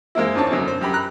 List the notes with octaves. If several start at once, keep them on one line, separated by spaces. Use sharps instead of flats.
G#3 A#3 C4 E4
E2 D#3 C4 D4 C#5 A5
F#2 B2 D3
C5
F#2 G4 B5
A#5 F#6